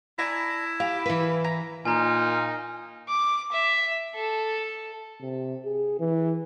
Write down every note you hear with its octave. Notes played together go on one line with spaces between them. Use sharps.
D4 E4 G#5 A#5
G4 F5
E3 B4
A#5
A#2 D#4 G#5 A#5 F6
D6
E5
A4
C3
G#4
E3